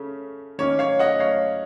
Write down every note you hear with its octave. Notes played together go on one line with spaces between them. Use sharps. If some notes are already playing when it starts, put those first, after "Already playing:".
Already playing: C#3 A3 C#4
D#3 A#3 C#4 C#5
C#5 F5
D#5 F#5
C#5 F5